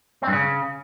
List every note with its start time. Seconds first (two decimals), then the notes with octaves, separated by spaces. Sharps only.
0.22 C4
0.27 G2
0.33 C#3